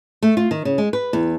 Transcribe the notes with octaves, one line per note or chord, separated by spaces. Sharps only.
A3
F4
D#3
C#3
G#3
B4
E2